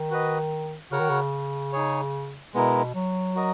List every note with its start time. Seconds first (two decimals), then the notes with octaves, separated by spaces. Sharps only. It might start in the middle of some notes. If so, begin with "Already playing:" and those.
Already playing: D#3
0.10 F#4 B4 D#5
0.91 C#3 F#4 A#4 C#5 F#5
1.00 D#3
1.10 C#3
1.72 D#4 G#4 C#5
2.54 B2 G#3 B3 E4 A#4
2.94 F#3
3.35 F#4 A#4 D#5